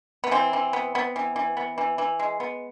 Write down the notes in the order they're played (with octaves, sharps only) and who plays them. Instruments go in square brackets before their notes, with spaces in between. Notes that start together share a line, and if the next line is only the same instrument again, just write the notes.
[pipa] B3
E3 C4
E3
B3
B3
E3
E3
B3
E3
E3
G#3
B3